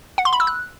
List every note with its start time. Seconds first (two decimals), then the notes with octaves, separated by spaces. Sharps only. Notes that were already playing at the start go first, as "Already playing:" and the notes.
0.18 F#5
0.25 C6
0.33 B5
0.40 E6
0.47 F#6